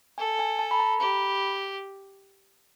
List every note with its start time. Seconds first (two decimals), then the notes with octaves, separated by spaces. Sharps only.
0.18 A4 G#5
0.39 G#5
0.59 A5
0.71 B5
0.80 A#5
1.00 G4 B5